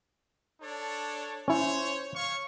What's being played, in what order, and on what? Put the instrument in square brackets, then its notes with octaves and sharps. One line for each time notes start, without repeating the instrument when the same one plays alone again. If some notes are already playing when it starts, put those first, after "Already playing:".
[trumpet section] D4 A4 C#5
[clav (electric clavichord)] C#4 E4 [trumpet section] C5 C#5
[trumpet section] C#5 F5 C#6